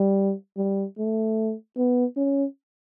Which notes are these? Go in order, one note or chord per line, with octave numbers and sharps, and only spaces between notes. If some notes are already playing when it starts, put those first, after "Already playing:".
Already playing: G3
G3
A3
B3
C#4